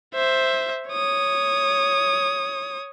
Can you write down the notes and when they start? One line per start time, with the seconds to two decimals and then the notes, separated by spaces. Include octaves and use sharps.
0.14 C5 E5
0.89 C#5 D#6